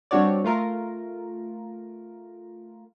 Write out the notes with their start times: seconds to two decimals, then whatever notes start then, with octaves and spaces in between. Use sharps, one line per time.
0.11 G3 C4 D4 F#4 C#5 D5
0.44 A3 F4 A#4